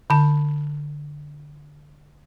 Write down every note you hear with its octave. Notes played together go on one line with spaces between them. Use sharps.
D3 A5